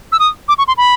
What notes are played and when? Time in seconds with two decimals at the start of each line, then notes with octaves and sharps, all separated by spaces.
0.12 E6
0.19 D#6
0.48 D6
0.58 C#6
0.68 C6
0.77 B5